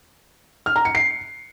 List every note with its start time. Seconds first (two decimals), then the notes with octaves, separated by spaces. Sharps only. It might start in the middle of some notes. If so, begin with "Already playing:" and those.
0.66 F6
0.76 A#5
0.85 C#7
0.95 C7